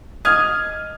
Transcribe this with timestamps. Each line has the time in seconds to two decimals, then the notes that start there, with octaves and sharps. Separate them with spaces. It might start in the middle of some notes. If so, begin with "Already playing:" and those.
0.25 D#5 F6 G#6